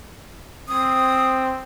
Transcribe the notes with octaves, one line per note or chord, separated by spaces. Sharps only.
C4 D#6